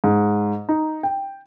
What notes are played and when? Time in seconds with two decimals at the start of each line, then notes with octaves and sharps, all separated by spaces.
0.04 G#2
0.69 D#4
1.03 G5